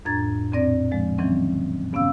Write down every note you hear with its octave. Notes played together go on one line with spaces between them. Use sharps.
F2 A2 D4 A#5 G#6 A6
F2 A#2 C4 D5 A#6
F3 G#3
D#3 E3 F#3 C4 C#4
G2 C#3 B3 C#4 F5 E6